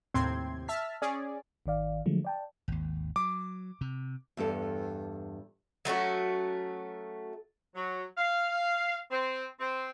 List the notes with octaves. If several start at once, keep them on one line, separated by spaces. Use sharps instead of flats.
D#2 A2 C3 C4 C6 G#6
E5 A5 F6 B6
C#4 G#4 D5
G#1 D#3 D5 F5
D3 F3 F#3 G#3 A3
D5 G5 A5
G#1 D#2
F#3 D6
C3
E2 G2 G4 A4
F#3 A3 C#4 F#4
F#3
F5
C4
C4